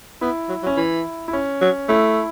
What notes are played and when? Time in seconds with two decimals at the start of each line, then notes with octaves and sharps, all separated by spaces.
0.21 B3 E4
0.49 F#3
0.63 F#3
0.67 C#4
0.77 E3 E4
1.28 E4
1.33 C#4
1.61 F#3
1.89 A3 E4